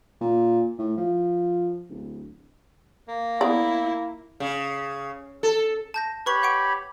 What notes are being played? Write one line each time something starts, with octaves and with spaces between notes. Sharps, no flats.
A#2
A2
F3
D1
A#3
B3 E4 D5
C#3
A4
A5 G6 A#6
G4 B4 C#5 B5 C#6 F#7
F#5 C#6 D7